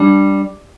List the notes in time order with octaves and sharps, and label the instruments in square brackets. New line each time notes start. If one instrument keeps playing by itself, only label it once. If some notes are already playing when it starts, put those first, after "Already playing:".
Already playing: [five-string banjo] G3 [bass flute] D4